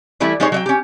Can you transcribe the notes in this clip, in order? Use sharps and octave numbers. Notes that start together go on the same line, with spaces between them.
E3 G3 A3 E4
G3 G#3 D#4 G#4 C5 C#5
F#3 D#5 G5
C#4 G4